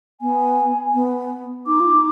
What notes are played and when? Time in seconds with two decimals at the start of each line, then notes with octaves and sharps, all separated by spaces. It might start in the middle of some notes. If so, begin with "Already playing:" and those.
0.21 B3 G#5
0.94 B3
1.67 D#4 D6
1.80 F4
1.94 D#4